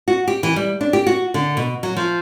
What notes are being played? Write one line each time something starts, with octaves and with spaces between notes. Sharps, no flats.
F#4
G4
E3
G3
D4
G4
F#4
D3
B2
F#3
F3